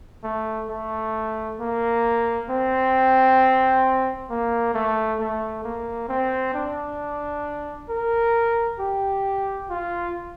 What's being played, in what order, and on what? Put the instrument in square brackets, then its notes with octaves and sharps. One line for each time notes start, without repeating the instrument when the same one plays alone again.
[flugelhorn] A3
A3
A#3
C4
A#3
A3
A3
A#3
C4
D4
A#4
G4
F4